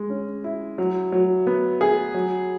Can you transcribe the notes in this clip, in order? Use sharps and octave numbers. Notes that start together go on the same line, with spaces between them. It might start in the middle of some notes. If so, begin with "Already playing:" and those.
Already playing: G#3
C#4
E4
F#3
F#3
B3
G#4
F#3